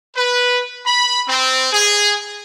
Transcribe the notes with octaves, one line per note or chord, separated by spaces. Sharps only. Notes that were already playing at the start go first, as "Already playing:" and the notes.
B4
B5
C4
G#4